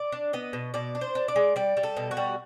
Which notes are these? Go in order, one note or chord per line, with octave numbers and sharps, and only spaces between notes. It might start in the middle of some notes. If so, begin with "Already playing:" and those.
Already playing: D5
D4
B3 D#5
B2
B2 D5
D4
C5
D4
D5
G#3
G3 D5
G3
A4
B2
F#4
G3